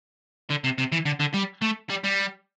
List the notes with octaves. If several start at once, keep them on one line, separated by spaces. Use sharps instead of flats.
D3
C3
C3
E3
D3
D3
G3
A3
G3
G3